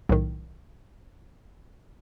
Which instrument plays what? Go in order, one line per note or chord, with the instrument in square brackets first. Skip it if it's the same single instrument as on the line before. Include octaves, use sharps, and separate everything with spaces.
[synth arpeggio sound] B1 A2 D#3